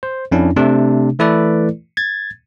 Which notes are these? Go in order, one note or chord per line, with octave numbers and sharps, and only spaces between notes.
C5
F2 C#4 D4 E4
C3 A3 D4
E3 A3 E4 A4 B4 D5
G#6 A6